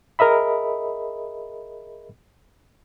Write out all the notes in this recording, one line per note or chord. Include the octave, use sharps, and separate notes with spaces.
G#4 A#4 D#5 E5 B5